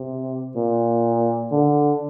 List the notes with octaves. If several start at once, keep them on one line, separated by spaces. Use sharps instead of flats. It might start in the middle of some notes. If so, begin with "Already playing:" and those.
Already playing: C3
A#2
D3